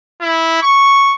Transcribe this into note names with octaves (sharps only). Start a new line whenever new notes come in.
E4
C#6